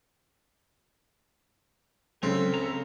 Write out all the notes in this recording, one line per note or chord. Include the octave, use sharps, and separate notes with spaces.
C#3 F#3 G#3 C4 A4
C#2 A#5